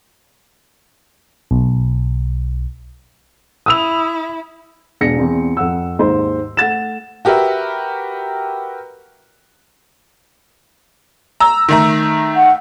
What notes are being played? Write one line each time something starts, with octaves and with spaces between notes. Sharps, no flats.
B1
E4 D#6 E6 F7
E1 D4 A#6 C#7
E2 C4
F2 F#5 E6
D#2 G#2 C5
A3 F#5 A6 E7
F#4 G4 A#4 B4 E5
A#5 E6
D#3 A3 A#5
F#5